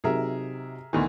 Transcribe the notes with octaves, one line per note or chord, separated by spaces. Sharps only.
C3 F#3 D#4 G#4 A#4 E5
D2 D#3 E3 C#6